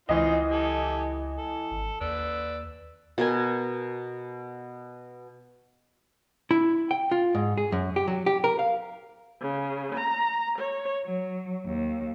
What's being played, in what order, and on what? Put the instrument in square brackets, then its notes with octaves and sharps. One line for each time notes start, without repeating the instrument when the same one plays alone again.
[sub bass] C#2 [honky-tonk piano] E3 D#5 [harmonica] C4 D#4 F4
[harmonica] G4 A4 G#5
A4
[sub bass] G#1
[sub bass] D#2 [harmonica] B4 D5 E6
[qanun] B2 A#4 G#5
[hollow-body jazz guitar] E4
G5
F4
G#2
G#4
F#2
G4
F#3
G4
A#4
F5
[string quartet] C#3
A#5
C#5
F#3
D#2